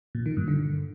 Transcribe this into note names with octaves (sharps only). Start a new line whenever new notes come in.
A#2
D#3
G2
D3